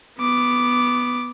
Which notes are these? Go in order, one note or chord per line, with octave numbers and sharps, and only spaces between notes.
B3 D6